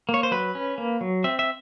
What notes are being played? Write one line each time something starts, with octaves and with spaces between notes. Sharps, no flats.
A#3
C#5
C5
F#3 B4
C#4
A#3
F#3
C4 E5
E5